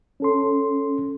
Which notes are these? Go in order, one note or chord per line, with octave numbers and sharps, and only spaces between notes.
C#4 A4 C6